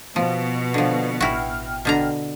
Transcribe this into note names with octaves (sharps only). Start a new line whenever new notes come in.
B2 F3
D3 F3
A1 E4 F#4 G5 F6
B2 D3 A#5